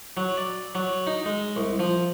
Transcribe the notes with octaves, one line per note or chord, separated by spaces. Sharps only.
F#3
D5
F#3
D#4
G#3
C2
F3